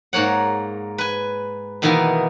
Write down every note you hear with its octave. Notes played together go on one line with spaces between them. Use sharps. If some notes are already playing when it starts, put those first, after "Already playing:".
G#2 A#3 C#5 F#5
B4 G#5
B2 D#3 E3 A#3 B3